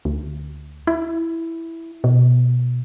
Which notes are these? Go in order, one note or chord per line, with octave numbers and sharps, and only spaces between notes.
D2
E4
B2